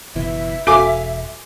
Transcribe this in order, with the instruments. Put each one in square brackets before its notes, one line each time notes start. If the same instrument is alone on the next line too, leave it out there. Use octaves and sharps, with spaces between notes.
[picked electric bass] F#1 B2 E3 [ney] E5
[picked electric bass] E1 [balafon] F#4 A4 [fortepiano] F5 G#5 D6